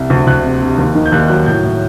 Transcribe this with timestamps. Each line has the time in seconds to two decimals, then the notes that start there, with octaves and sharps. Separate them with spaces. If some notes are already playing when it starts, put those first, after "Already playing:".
Already playing: C2
0.10 D2
0.27 D2 F#6
0.45 C3
0.62 C3
0.78 D#2
0.95 D#3
1.06 G6
1.12 D#2 F#6
1.28 F#3 F#6
1.46 A2 G6
1.63 A2